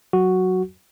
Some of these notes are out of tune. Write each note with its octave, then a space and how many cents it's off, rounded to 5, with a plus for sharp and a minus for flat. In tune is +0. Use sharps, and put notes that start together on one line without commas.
F#3 +0 F#4 +0